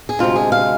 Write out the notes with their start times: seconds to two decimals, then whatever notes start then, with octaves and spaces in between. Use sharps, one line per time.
0.09 G#4
0.19 D2 C3 G#3 F4
0.36 G#4
0.52 F5